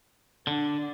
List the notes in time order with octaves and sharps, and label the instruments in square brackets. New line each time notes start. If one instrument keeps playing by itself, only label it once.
[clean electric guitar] D3 [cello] D4